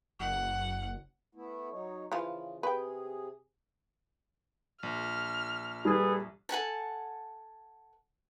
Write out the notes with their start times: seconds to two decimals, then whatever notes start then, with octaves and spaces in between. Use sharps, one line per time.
0.20 F#1 F#5
1.35 A3 B3 E4
1.71 F#3 D#4 C#5
2.12 C#3 E3 F3 F4
2.63 C3 G#4 B4 G5
4.83 A#1 F6
5.85 G3 G#4 A4 B4
6.49 A4 F#5 G#5 A5